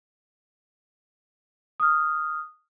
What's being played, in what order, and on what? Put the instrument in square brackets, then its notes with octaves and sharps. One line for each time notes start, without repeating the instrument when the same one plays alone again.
[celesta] D#6 F6